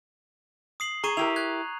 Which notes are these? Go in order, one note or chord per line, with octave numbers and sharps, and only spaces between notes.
D#6 C7 F#7
G#4 A#5 C#6 D#7
E4 G4 A#4 F7
F#6 G#6